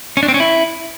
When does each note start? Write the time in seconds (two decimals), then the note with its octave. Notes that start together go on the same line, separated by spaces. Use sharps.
0.17 C#4
0.23 D4
0.28 C4
0.34 C#4
0.40 E4